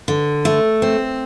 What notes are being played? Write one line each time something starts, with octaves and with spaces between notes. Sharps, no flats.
D3
A3
C4